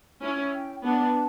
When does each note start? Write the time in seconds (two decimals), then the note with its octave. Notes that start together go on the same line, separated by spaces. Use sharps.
0.22 C#4 E4
0.54 G5
0.84 B3 D4 A5